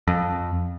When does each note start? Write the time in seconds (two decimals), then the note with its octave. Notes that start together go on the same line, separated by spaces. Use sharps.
0.07 F2